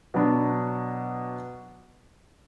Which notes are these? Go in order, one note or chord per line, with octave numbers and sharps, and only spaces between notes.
B2 F#3 B3 D4